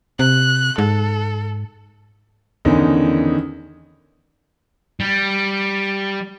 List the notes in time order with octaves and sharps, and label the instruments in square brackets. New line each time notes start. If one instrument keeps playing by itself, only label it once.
[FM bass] C3 [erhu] F#6
[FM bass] G#2 [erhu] A4
[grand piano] E2 D3 D#3 C#4 D#4
[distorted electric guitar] G3